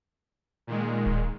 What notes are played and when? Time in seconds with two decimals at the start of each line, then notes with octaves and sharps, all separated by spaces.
0.67 A#2 D#3 G#3
1.06 D1